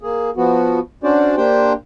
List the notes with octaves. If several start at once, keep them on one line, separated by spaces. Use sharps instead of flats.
A#3 G#4
F3 B3 F#4
C#4 D4 F#4 C5 D5
A#3 D4 G4 C5 G5